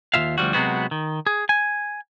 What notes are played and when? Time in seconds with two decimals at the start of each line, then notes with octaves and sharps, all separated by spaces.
0.14 D#2 D#3 F4 E5 F5
0.38 D2 F3 G3 F#4
0.53 C3 F#3 G#3 B3 C4 F#4
0.91 D#3
1.26 G#4
1.49 G#5